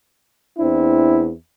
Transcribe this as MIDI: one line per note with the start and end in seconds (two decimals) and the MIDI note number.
0.59 1.31 40
0.59 1.31 60
0.59 1.31 62
0.59 1.31 64